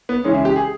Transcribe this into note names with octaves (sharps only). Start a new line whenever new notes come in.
B3
C#3 E3 G#3 C#4
E4
G4
G#4